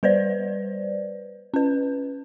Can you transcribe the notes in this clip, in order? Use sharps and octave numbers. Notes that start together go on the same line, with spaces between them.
G3 B4 C5 D5
C#4 B4